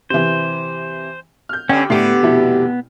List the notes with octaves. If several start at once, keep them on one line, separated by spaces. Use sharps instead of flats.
C3 E3 C5
F6 G6
G2 D3 C#4 G5
A2 D3 B3 G4 C7
F1 B2 E4